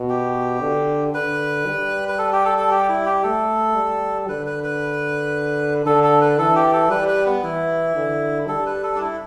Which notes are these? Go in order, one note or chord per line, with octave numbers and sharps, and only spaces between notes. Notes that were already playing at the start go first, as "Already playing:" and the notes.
Already playing: B2
G4
D3
D3 B4
G3
B4
A4
G4
A4
A4
G4
E4
G4
A3 A4
G3
D3 B4
B4
B4
D3 A4
A4
B4
E3 A4
G4
A4
G3 B4
B4
B3
E3 E4
D3
G3 A4
B4
A4
D4
E4